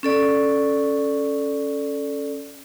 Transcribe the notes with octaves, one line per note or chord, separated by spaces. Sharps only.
C#4 A4 D5